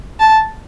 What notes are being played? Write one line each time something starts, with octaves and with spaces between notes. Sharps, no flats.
A5